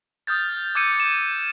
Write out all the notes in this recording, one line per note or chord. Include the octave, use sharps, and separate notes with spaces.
D#6 F6 G6 A6
D6 E6 G6 G#6 C#7 D#7
E7